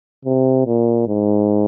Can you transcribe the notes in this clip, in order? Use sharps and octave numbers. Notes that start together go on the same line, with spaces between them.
C3
A#2
G#2